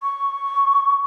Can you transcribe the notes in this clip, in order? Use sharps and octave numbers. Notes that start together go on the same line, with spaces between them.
C#6